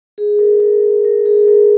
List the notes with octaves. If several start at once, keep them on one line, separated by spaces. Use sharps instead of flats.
G#4
A#4
A#4
A#4
G#4
A#4